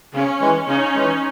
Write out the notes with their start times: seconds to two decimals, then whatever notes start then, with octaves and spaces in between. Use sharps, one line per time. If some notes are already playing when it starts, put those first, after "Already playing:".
0.13 C#3 C#4
0.41 E3 G#3
0.67 C#3 C#4 D#4
0.94 E3 G#3